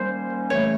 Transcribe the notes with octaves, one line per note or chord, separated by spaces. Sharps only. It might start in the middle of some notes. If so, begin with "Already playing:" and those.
Already playing: D#3 G3 A#3 C#4 C5
C#3 E3 A3 C#5